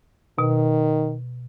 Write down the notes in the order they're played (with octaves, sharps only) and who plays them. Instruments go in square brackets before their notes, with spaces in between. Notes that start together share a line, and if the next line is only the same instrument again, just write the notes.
[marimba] B2 [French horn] D#3